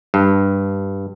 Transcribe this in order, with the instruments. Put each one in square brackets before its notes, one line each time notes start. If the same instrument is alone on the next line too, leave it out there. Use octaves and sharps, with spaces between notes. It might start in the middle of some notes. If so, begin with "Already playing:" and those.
[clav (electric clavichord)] G2